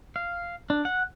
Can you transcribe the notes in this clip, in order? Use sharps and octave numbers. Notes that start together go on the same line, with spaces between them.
F5
D4
F#5